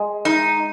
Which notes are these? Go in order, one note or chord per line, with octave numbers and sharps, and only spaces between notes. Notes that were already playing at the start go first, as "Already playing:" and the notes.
Already playing: G#3
D#4